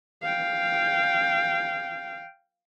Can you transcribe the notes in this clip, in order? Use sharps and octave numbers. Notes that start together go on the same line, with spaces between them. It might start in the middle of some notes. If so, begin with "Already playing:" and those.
F5 G5